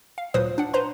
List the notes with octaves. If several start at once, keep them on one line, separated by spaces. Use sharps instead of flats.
F5
D2 A#2 F#3 B4 C5 D#6
D4 F#5
B4 C5 A#5 C6